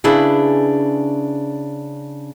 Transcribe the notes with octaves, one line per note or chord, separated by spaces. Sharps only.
C#3 D4 E4 G#4 B4